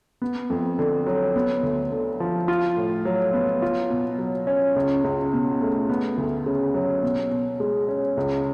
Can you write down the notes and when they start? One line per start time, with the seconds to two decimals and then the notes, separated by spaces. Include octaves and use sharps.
0.22 B3
0.50 F2
0.79 D3
1.06 F#3
1.36 B3
1.63 D2
1.92 D3
2.20 F3
2.48 F4
2.76 A2
3.05 F#3
3.34 B3
3.62 F4
3.90 B2
4.18 F#3
4.47 C#4
4.76 C#2
5.04 C#2
5.33 B2
5.61 A3
5.90 B3
6.18 D2
6.46 C#3
6.74 F#3
7.03 B2
7.31 B2
7.60 G#3
7.88 C#4
8.17 C#2